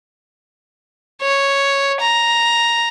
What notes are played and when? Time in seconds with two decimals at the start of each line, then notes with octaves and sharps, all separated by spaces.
1.21 C#5
2.00 A#5